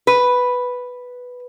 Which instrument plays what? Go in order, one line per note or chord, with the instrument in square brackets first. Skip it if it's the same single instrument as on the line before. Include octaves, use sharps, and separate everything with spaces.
[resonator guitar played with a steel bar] B4